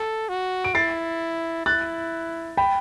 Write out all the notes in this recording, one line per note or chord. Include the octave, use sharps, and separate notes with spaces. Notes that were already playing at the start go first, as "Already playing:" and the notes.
Already playing: A4
F#4
D7
E4 A6 C7
E4 F#6 A6
G5 B5